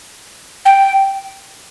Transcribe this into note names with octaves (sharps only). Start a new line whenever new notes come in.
G5